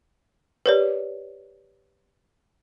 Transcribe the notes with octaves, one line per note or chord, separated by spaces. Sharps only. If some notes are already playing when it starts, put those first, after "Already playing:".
G4 A#4 B4 C#5 D5